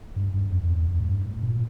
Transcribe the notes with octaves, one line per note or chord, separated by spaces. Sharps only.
G2
G2
F2
F2
E2
F2
A2
G2
A2
A#2